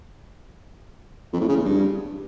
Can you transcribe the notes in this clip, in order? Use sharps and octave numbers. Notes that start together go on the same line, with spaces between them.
F2
A2
C#3
E2
G2